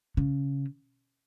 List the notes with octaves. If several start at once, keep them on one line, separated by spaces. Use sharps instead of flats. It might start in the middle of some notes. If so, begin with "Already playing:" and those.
C#3